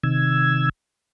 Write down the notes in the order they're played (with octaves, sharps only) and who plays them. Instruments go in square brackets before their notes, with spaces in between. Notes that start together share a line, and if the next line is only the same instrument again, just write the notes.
[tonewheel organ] C3 D#3 E6 G#6